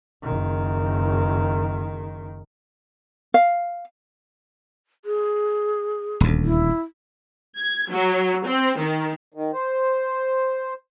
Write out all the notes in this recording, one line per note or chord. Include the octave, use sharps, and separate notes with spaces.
F#1 D#3
F5
G#4
D#1 D2
E4
G#6
F#3
C4
D#3
D#3
C5